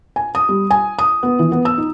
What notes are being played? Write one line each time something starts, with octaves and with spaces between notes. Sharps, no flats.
G#5
D#6
G3
G#5
D#6
B3
E3
B3
E6
D#4